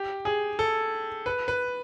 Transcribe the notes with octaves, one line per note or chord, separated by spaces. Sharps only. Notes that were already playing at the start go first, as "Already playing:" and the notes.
Already playing: G4
G#4
A4
B4
B4